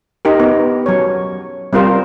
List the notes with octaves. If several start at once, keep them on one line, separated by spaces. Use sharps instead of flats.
D#4 G4 A#4
B3
F#3 C#5
G3 C4 F4 A#4 C5